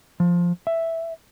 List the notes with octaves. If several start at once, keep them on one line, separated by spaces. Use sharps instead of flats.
F3
E5